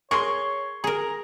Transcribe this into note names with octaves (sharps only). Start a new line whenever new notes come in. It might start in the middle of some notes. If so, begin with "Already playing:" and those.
G#4 A#4 C#5 C6 C#6
G#4 A#4 A#5